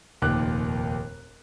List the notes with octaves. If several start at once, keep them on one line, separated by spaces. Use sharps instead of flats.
F1 D#2 A#2 D6 F#6